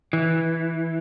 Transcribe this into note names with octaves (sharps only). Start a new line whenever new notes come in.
E3